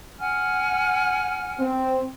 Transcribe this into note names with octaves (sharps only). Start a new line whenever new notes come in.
F#5 G#5 F6
C4